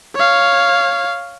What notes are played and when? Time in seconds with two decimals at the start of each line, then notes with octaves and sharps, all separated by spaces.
0.15 C#5 F5